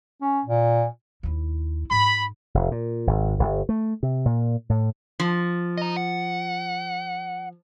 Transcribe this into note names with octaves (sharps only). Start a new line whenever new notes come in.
C#4
A#2
D#2 E4
G#2 B5
F1
A#2
G#1
G1
A3
C3
A#2
A2
F3
D#5 A#5
F#5